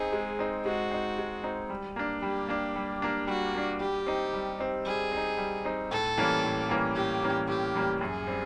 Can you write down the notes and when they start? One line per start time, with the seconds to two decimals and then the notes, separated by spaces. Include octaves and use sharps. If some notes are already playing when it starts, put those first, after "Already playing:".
Already playing: C4 D#4 G#4
0.13 G#3
0.39 C4 D#4
0.65 G#3 F#4
0.91 C4 D#4
1.18 G#3
1.43 C4 D#4
1.70 G3
1.96 A#3 D4
2.22 G3 G4
2.49 A#3 D4
2.76 G3
3.02 A#3 D4
3.27 G3 F#4
3.54 A#3 D4
3.80 G3 G4
4.06 C4 D#4
4.33 G3
4.59 C4 D#4
4.85 G3 G#4
5.12 C4
5.17 D#4
5.37 G3
5.65 C4 D#4
5.91 A2 A4
6.17 E3 G3 A#3 C#4
6.44 A2
6.69 E3 G3 A#3 C#4
6.95 A2 G4
7.22 E3 G3 A#3 C#4
7.48 A2 G4
7.74 E3 G3 A#3 C#4
8.01 F#2 G#4
8.27 G3 C4